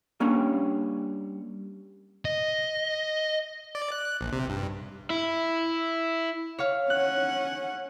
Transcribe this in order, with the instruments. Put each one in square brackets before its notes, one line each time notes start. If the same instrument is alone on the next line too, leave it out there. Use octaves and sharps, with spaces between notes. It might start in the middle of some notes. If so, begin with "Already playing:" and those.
[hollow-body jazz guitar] G3 A#3 C#4 D4 C#5
[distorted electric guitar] D#5
[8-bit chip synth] D5
F#6
A#1
C3
G2
[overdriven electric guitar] E4
[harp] C#5 F5
[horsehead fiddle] C#4 F#5 [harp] F#6